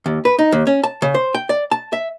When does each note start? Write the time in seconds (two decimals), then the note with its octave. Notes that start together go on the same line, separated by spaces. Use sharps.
0.06 D#2
0.25 B4
0.39 D#4
0.52 D#2
0.67 C#4
0.83 A5
1.02 C#3
1.14 C5
1.34 G5
1.49 D5
1.71 A5
1.93 E5